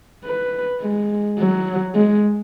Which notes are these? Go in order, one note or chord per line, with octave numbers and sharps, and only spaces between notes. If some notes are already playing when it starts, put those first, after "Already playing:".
B4
G#3
F#3
G#3